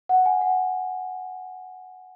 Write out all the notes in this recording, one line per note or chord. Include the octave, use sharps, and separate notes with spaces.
F#5
G#5
F#5